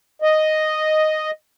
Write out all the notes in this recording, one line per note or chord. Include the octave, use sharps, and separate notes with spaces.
D#5